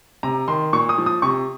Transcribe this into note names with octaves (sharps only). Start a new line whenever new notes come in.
C3 A#5
D#3 C6
A#2 C#6
D#6
F3
D#6
C3 C#6